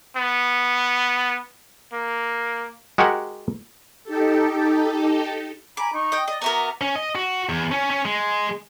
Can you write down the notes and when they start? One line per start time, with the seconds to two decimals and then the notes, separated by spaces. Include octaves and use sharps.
0.17 B3
1.93 A#3
2.98 G#3 F#4 G4 A#4 F#5
4.04 D#4 G4 A4
5.77 G#5 A#5 B5 D6
5.93 D#4 C#6
6.12 D#5 G5
6.28 D5 D#5
6.42 B3 F#4 A#4 E5 A#5 D6
6.81 C#4
6.96 D#5
7.15 F#4
7.49 E2
7.72 C#4
7.90 C#4
8.05 G#3